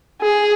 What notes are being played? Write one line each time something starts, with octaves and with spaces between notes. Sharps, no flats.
G#4